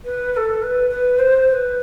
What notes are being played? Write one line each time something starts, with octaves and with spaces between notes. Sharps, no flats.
B4
B4
A4
B4
B4
C5
C5
B4